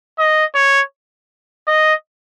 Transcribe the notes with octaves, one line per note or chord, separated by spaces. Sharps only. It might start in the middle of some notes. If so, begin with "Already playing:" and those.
D#5
C#5
D#5